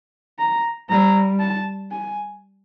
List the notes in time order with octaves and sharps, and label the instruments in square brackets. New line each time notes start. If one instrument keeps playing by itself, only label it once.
[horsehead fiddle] A#5
[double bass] G3 [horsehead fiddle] A#5
[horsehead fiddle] A5
G#5